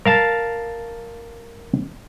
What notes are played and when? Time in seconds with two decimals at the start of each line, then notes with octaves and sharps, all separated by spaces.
0.05 A#4 F5 A5